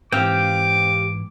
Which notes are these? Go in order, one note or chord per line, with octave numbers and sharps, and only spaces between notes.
G#2 E3 C4 G4 F5 G5 D6